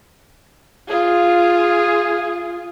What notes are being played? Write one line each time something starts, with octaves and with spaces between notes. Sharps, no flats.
F4 G#4